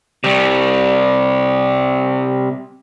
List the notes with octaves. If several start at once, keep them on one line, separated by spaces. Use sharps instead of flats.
C3 G3